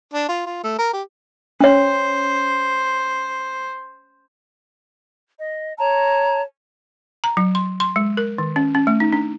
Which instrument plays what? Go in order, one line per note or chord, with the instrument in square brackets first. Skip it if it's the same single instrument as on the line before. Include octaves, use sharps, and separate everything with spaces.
[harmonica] D4
F4
F4
A3
A#4
G4
[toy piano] C#4 C#5 [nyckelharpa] C5
[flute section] D#5
C#5 A5 A#5
[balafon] A#5
F#3
C6
C6
G#3
A#4
D#3
C#4
C#4
A3
D#4
D4